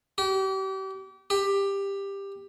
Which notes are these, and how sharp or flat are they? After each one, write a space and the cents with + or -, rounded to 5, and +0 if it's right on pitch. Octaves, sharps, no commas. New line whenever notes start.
G4 -35
G4 +15